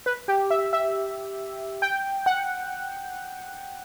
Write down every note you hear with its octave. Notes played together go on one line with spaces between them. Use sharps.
B4
G4
E5
E5
G5
F#5